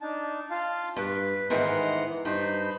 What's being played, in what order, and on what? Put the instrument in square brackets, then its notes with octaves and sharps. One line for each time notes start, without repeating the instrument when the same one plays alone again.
[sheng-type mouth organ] D4 D#4 A5
F4 F5 A5
[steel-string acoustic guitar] G2 [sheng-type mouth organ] B4
[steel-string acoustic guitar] G#2 D#3 E3 [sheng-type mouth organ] F#5 A#5 C6
[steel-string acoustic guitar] G2 [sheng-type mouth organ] D#4 C5 B5